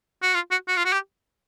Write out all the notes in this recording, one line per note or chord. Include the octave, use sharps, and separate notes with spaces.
F#4
F4
F#4
F#4
F4
F#4
G4